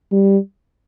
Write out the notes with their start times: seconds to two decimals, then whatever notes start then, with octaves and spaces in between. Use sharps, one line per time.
0.12 G3